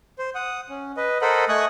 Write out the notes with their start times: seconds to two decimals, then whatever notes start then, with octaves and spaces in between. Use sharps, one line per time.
0.19 C5
0.35 F#5 D#6
0.69 C#4
0.97 B4 D#5
1.22 A4 A#4 C5 D#5 F#5 B5
1.49 A3 D#5 G#5 C#6 D#6 F#6